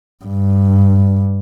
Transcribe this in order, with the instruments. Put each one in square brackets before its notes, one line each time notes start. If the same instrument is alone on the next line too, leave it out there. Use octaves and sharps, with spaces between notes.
[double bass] G2